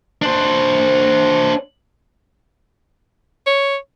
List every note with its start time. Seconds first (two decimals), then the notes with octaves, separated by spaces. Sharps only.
0.22 D4 C5
3.46 C#5